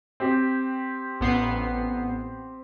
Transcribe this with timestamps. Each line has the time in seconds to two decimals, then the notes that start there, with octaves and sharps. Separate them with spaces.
0.20 C4 G4
1.21 A1 B3 C7